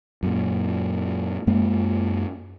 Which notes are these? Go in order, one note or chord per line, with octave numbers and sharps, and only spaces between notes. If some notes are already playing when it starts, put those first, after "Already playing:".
F#2 A#2
F#2 G#3 A#3